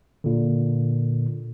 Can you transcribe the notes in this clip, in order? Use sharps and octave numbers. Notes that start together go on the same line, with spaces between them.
A#2 D3